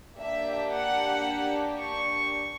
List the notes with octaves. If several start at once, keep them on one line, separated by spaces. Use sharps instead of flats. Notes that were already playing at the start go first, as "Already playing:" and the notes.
A#3 D4 G4 E5
F#5
C#6